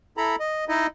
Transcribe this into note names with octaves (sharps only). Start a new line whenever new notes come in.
E4 A4 A#5 B5
D#5
D#4 E4 D#5